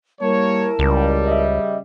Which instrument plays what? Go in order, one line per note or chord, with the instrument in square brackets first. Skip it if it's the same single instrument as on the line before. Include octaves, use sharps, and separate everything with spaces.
[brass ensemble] G3 A#3 C#5 [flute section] E4 A#4 A5
[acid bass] C#2 [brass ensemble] C#3 G3
[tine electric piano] D#5 E5